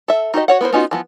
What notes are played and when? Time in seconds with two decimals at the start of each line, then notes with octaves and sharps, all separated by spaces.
0.08 A4 E5
0.34 D#4 F#4 G4 D#5
0.48 F#4 C#5 F#5
0.61 B3 E4 A#4 C5
0.73 B3 C#4 D#4 F4 F#4
0.91 E3 F3 B3